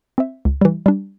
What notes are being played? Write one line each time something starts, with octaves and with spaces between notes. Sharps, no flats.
C4 C5 E5
C#2
E3 G3
G3 D4